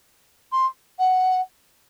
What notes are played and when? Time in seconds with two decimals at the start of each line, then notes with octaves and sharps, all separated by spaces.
0.52 C6
0.99 F#5